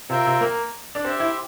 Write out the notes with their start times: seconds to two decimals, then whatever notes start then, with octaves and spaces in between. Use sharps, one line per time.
0.10 C3 C4 F4 A#4 E5 G5
0.26 C3
0.41 A#3
0.95 D4
1.05 C4 G4 C5 E5
1.20 E4